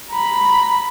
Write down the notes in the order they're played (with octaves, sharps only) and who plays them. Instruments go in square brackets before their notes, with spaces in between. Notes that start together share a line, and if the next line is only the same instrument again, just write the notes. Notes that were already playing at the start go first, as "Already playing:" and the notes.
[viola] A#5 B5